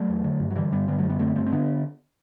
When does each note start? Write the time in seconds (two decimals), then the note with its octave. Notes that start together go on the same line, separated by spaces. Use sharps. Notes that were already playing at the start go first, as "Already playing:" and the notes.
Already playing: F#3 A3
0.09 E2
0.24 D3
0.40 G2
0.51 F#3
0.56 D3 E3 G3
0.72 G2 G3 B3
0.88 D3 G3 B3
0.98 F#3 A3
1.03 F#2
1.09 G3 B3
1.19 D3 A3 C4
1.36 G2 A3 C4
1.46 C4
1.52 D3 B3 D4